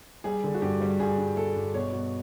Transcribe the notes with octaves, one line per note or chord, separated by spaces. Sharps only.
G3 G#4
D3
F#4
G2 G4
G3
G2 G#4
G2
G3 A4
G2
B2 C#5
B2